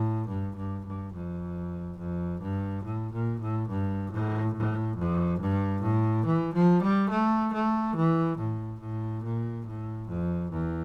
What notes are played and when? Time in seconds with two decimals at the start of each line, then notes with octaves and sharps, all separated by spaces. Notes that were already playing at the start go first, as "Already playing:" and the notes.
Already playing: A2
0.28 G2
0.56 G2
0.85 G2
1.14 F2
1.98 F2
2.41 G2
2.84 A2
3.13 A#2
3.40 A2
3.68 G2
4.11 A2
4.54 A2
4.97 F2
5.40 G2
5.82 A2
6.25 E3
6.54 F3
6.82 G3
7.10 A3
7.53 A3
7.96 E3
8.38 A2
8.80 A2
9.24 A#2
9.66 A2
10.08 F2
10.51 E2